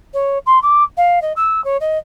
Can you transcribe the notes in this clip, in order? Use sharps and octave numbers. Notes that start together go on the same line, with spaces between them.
C#5
C6
D6
F5
D#5
E6
C#5
D#5